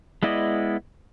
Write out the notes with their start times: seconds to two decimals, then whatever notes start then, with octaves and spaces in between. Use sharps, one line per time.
0.23 G#3 B3 E4 D5 D#5